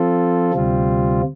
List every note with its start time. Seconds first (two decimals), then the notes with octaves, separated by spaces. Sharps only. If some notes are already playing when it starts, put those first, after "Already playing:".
Already playing: F3 C4 F4 A4
0.53 D2 C3 G3 C4 F4